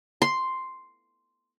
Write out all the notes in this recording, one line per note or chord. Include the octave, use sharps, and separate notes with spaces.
C6